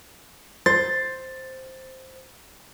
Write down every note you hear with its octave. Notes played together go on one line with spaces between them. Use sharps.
C5 A6